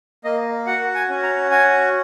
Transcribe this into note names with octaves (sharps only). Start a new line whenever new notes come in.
A#3 D#5
F#4 F#5
G#5
C#4
A#5
F#4 G#5